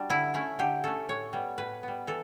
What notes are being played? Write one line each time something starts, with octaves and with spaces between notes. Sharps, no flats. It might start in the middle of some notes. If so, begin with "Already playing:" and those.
Already playing: G3 D4 F#4
D3 E4
A3 C#4 E4
D3 G4
A3 C#4 A4
A2 C#5
G3 B3
A2 B4
G3 B3
E3 A4